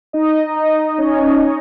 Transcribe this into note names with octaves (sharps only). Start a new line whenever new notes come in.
D#4 D#5
D#4 D#5
C#4 C#5